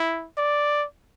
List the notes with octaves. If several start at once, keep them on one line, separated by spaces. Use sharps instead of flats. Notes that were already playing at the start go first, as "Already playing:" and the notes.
Already playing: E4
D5